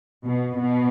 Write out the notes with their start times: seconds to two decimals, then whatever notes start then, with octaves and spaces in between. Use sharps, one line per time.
0.25 B2
0.57 B2